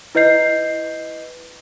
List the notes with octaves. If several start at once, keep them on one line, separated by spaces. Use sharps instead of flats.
E4 B4 D#5 G6 C7